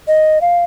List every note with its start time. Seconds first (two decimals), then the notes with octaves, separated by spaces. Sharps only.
0.08 D#5
0.41 F5